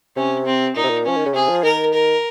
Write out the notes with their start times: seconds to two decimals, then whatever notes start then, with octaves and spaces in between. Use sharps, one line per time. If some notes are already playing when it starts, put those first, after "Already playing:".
0.16 C3 C#4
0.46 C4
0.76 A#2 D#4
0.83 C3
0.90 A#2
1.05 F3 C#4
1.17 D#3
1.26 C#3
1.34 C3 G#4
1.49 F3
1.63 D#3 A#4
1.93 A#4